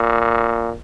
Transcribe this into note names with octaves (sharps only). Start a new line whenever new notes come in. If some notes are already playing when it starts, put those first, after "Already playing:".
Already playing: A#2